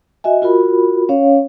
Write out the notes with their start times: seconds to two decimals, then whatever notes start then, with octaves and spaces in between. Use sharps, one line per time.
0.24 F#4 D#5 E5 G#5
0.42 F4 F#4 A#4 B5
1.09 C#4 C#5 F5